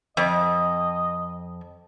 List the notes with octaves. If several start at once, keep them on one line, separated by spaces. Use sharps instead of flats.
F2 D#5